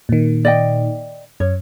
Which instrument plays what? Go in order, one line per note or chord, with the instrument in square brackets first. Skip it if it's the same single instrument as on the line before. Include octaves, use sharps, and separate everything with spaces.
[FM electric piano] A#2 D#3
[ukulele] D5 D#5 G5
[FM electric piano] F#2 [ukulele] C#5